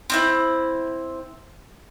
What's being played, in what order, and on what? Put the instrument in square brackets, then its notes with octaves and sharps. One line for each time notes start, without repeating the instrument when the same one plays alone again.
[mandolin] C4 D4 E4